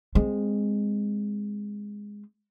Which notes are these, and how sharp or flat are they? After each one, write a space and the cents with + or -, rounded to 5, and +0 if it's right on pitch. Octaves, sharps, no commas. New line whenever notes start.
G#3 -10 C4 +0